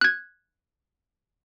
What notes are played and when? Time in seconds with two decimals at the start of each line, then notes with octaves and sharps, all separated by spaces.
0.01 F#6 G#6